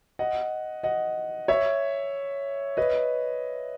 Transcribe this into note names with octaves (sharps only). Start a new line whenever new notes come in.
D#5 F#5
D#5 F#5
C#5 E5
B4 D#5